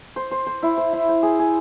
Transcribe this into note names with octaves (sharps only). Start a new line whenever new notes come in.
C5
C5
C5
E4
C5
E4
C5
G#4
G#4